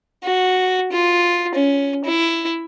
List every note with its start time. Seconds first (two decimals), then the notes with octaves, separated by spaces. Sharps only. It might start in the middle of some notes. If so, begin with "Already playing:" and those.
0.24 F#4
0.92 F4
1.55 C#4
2.05 E4